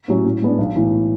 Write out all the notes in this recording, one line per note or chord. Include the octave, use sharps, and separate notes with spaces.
A2 F#3 C#4
A2
G#3 B3 D4
B1
A2 E3